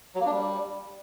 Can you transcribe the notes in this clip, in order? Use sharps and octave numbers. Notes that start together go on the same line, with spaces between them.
F#3
A#3
D4
G3